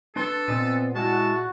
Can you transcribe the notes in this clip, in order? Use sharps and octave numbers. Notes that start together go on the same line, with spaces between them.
D4 A4 B4 C6
A#2 B3 C4 D#5
G#3 E4 F#4 A5